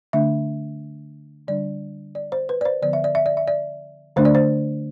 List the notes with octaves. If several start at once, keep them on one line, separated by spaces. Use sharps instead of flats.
D3 A3 D4 E5
D3 G3 D4 D5
D5
C5
B4
D5
C5
D3 F3 B3 D5
E5
D5
E5
D5
E5
D5
D3 A3 D4 C5
D5
C5